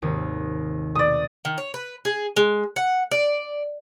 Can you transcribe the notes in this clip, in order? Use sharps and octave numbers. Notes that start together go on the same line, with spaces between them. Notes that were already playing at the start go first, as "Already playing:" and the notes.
G#1 D#2 C3
B2 A3 D5 D#6
D#3
C#5
B4
G#4
G#3
F#5
D5